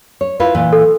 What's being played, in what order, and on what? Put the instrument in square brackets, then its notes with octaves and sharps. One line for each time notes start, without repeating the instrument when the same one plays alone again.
[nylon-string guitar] C#5
E4 F4 B4
A#2 E3
[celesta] A4